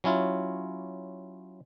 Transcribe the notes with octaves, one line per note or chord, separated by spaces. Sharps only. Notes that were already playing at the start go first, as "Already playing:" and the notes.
F#3 C#4 E4 F4